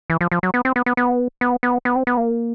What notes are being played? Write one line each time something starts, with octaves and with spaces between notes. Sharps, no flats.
E3
F3
F3
F#3
B3
C4
B3
B3
B3
B3
B3
B3
C4
B3
A#3